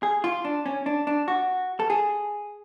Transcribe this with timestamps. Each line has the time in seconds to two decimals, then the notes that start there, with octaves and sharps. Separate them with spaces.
0.03 G#4
0.24 F4
0.45 D4
0.66 C#4
0.86 D4
1.07 D4
1.28 F#4
1.80 A4
1.90 G#4